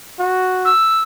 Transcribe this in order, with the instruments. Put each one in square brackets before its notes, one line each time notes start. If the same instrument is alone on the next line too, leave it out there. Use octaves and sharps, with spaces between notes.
[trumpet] F#4
[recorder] E6